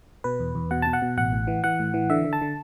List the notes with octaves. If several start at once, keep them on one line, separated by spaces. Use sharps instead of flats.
B2 B4
E2
E2
B2 F#5
B2 A5
F#5
B2
A1 F#5
A2
E3
E3 F#5
A2
E3
D3 E5
D3
A5
D3